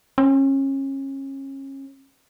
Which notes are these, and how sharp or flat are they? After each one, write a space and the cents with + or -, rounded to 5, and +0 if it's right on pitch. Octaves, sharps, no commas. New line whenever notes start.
C#4 -30